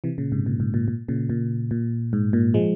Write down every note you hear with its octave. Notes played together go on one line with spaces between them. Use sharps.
C3 E3
A#2 C#3
G#2 C3
A#2
G#2
A#2
A#2
A#2 C#3
A#2
A#2
G#2
A#2
F3 G#3